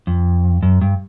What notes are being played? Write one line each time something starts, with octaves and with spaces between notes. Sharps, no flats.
F2
F#2
G2